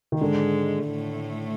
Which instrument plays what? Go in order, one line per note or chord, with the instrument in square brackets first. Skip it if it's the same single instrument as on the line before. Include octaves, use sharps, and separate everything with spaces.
[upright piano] D#3
[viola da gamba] G#2 G#3 [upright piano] D3
[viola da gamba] A2 A3